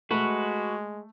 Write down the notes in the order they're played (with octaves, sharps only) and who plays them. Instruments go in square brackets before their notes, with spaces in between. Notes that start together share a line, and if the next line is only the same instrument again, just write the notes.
[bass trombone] G#3 [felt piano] A3 [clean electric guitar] F#4 B4